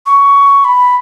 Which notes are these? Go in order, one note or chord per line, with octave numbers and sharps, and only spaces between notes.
C#6
B5